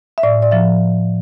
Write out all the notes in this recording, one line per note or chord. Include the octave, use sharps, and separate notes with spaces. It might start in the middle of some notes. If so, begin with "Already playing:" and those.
E5
A2 D5
D5
F3 E5